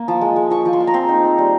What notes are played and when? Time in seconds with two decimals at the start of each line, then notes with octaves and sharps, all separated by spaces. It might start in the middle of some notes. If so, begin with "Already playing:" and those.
Already playing: A#3
0.08 F3
0.21 G#3
0.36 G#3
0.51 F3 C#6
0.65 F3
0.73 C6
0.80 F3
0.87 A#5
0.94 C4 C6
1.09 D#4
1.24 C4
1.38 G3